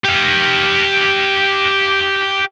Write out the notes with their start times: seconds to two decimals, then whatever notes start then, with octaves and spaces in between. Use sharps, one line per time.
0.05 G4 F5